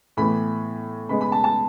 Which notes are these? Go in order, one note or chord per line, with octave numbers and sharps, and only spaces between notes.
A2 E3 B3 B5
C#3 G#3 B3 B5
B5
A5
A5